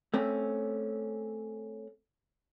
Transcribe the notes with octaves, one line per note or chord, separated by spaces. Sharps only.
A3 C4 C#4